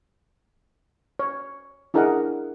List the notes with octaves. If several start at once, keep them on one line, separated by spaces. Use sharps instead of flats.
C#5
D4 E4 G#4 A#4 D#5 F#5